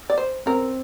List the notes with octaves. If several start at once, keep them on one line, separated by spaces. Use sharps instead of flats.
D5
C5
C4 A#4